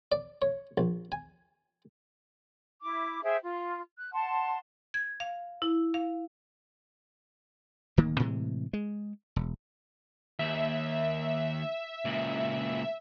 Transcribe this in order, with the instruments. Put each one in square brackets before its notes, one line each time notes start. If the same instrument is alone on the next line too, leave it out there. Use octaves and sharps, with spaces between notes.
[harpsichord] D5
C#5
A#1
G#5
[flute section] E4 D6
G#4 C5 E5 G5
F4
F#6
F#5 A5 C6
[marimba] G#6
F5
E4
F5
[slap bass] D1 D#3 A#3
A2 C3 E3 G#3
G#3
E1
[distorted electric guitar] D#2 [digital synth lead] E5
[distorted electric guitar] C#2 A#2